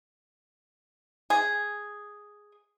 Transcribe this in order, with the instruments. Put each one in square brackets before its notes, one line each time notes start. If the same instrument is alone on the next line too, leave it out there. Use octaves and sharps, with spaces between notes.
[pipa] G#4